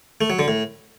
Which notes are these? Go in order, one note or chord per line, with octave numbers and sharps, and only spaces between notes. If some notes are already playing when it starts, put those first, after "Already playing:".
A3
F#3
D3
A2